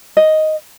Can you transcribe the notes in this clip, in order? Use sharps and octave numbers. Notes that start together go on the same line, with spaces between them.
D#5